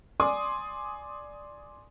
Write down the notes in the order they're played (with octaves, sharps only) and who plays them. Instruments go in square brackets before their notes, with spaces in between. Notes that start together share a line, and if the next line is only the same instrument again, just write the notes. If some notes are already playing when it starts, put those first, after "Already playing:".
[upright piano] D5 G#5 C6 D6 D#6